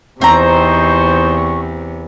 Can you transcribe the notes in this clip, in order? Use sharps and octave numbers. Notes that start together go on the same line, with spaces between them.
E2 C3 C4 D#4 C5 A#5 C#6